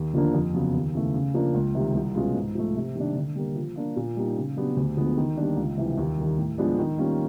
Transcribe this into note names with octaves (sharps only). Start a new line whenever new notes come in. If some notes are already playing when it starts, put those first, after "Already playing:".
Already playing: D#2
D3 F3 A#3 D4
F2
C#3 F#3 B3
D#2
C#3 E3 A3
C#3
F3 A#3 D4
C#2
C3 D#3 G3
C2
B2 G#3 C#4 F4
G#2
F3 A3
C3
D#3 G3 A#3 D4
D3
G3 A#3
F3
A#3 D4 F4
A#2
G3 A#3 D#4
C#3
F#3 B3 D4 G4
D2
D3 F3 G#3 B3
D#3
G3 A#3 D4
C#2
C3 E3 G3
D#2
D#3 G3
A2
F3 G#3 B3 D4
D#3
G3 A#3 C#4 F4